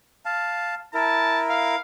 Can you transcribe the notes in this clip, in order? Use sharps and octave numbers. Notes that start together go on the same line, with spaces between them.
F5 A5
E4 A#4 A5
F5